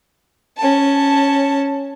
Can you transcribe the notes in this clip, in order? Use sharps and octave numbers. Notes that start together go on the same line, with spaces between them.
C#4 A5